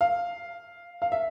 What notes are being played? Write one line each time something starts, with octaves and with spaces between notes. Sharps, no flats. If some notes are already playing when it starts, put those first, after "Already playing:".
F5
F5
E5